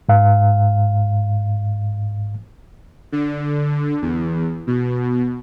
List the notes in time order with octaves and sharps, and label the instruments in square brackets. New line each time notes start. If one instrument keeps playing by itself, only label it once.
[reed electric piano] G#2 F5
[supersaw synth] D3
E2
B2